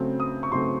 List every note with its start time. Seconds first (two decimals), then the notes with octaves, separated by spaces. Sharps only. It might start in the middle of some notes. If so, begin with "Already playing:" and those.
Already playing: C#3 F#3 A3 C4
0.20 D#6
0.43 C#6
0.52 C#3 F#3 A3 C4 C6